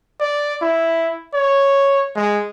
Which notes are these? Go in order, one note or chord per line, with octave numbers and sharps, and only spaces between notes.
D5
E4
C#5
G#3